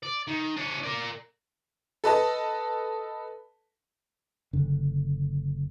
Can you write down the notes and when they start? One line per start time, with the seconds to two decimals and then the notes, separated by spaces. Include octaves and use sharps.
0.03 D5
0.27 D#3
0.56 D4 C#5
0.83 A#4 D5
2.04 A4 B4 D#5 A5
4.53 F#1 D3